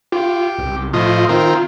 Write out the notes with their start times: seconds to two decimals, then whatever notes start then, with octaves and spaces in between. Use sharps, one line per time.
0.12 F4 G4
0.58 C2
0.93 A2 F3 F4 D#5
1.29 D#3 C4 A#4